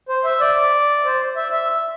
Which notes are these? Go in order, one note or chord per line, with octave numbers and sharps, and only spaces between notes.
C5
E5
D5
C5
E5
E5